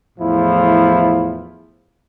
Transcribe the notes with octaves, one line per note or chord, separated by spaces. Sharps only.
E2 A2 F3 E4